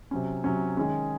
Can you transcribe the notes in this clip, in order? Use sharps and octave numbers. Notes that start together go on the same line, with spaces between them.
C3 F#3 C#4
C3 F#3 C#4
D#3 G#3 C#4 G#4